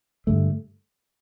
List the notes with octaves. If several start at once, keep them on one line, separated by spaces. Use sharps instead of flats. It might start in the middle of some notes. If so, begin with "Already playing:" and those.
G2 D3 A3